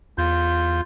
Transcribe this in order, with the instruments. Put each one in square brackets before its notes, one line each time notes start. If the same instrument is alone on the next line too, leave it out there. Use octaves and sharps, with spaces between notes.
[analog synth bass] E2 [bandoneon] F4 G6